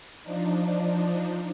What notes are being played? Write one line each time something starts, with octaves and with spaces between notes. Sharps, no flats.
F3 D4 D#4